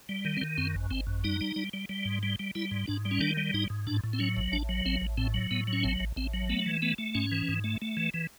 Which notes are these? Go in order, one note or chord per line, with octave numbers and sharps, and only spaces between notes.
G3
D#3
C4
D#3
F#2 C4
G#1
G#1 C4
F#2
G3 D#4
G3
G3
G3
G3
G#2
G3
G3
G3 E4
G#2
G#2 D4
G3
C#4
D#3 D4
G3
G#2 D#4
G#2
A2 D4
A2
C4
F#3 C#4
A1
A1 D4
F#3
A1 C4
A1
A2 C4
F#3
A2 B3
F#3
C#4
A1 C4
A1
A1 C4
F#3
A3 B3
E3
A3 B3
A3
G#2 C#4
E3
G#2
A3
A3
E3
E3